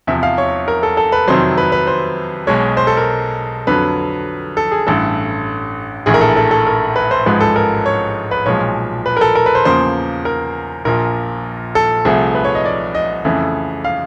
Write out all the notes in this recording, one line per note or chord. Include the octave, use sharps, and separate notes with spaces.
E2 C3 F3 E5
F5
C#5
A#4
A4
A4
B4
F2 C3 D#3 F#3 C5
B4
B4
C5
B1 B2 G#3 C#5
C5
A4
A#4
F2 D3 F#3 B4
A4
G#4
A1 G2 E3 A3 A4
A#1 A2 E3 G#4
A#4
A4
A4
A4
A#4
B4
C5
A1 G#2 F3 G#3 B4
A4
A#4
C#5
B4
B1 A#2 F3 G#3 C#5
B4
A#4
A4
A#4
B4
C5
E2 C#3 F3 A#3 C5
A#4
A#1 A#2 F3 A#4
A4
C2 C3 F3 A3 G#4
B4
C#5
D#5
D5
D#5
F2 C#3 E3 A3
F5